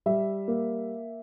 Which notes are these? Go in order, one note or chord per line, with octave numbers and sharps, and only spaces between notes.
G3 E5
A#3